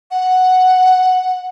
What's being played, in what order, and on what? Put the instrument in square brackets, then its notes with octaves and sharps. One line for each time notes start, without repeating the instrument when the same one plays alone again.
[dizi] F#5